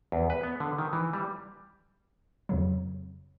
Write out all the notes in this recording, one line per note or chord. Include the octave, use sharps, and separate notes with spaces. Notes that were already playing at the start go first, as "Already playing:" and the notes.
E2
B4
B3
D3
D#3
E3
G3
F2 C#3 F#3